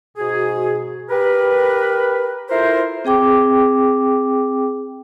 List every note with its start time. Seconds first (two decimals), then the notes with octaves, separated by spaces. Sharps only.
0.17 G#2 B2 F#4 G#4
1.10 G4 A#4 B4
2.50 E4 F4 A4 A#4 C5
3.05 C4 G#4 G5 D6